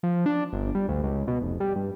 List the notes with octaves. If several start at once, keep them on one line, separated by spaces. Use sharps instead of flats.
F3
D4
G1
G3
D2
C#2
B2
F1
G3
G2